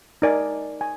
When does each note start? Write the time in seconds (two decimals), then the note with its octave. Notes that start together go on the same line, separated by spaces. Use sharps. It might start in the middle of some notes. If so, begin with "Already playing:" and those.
0.22 D#4 A#4 D5 G#5
0.81 G#5